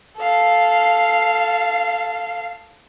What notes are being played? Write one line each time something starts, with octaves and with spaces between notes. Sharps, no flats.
A4 F5